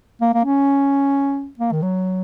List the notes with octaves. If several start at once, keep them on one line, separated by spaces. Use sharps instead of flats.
A#3
A#3
C#4
A#3
D#3
F#3